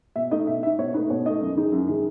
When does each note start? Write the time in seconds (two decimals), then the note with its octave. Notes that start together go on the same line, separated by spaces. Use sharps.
0.16 B2 E5
0.31 A3 D#4 D#5
0.47 B2 E5
0.63 A3 D#4 E5
0.78 B2 C#5
0.94 A3 D#4 B4
1.10 B2 C#5
1.26 A3 D#4 D#5
1.41 F#2
1.57 D#3 G#3 D#4
1.72 F#2
1.88 D#3 G#3 D#4